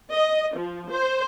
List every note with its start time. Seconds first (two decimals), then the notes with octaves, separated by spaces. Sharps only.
0.12 D#5
0.55 F3
0.91 C5